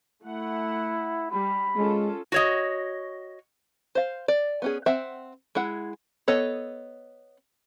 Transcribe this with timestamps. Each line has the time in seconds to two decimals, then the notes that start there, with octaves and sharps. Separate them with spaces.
0.23 A3 E4 F#5
1.31 G3 B5
1.77 G#3 C#4 F4 A4
2.32 F#4 C#5 D#5
3.95 C5 F5
4.28 D5
4.62 B3 C#4 G#4
4.86 C4 E5 F#5 G5
5.55 G#3 E4 F#5
6.28 B3 A4 C#5 D#5